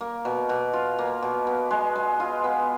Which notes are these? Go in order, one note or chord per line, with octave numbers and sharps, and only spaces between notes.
A#3
B2
B2
F4
A#3
B2
B3
G#3
G#3
F4
B3